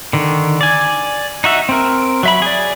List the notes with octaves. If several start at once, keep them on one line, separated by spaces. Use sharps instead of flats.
D3 D#3
D5 G#5
D#4 F#4 E5
C4 A#4
F#3 E5 B5
G#4 D5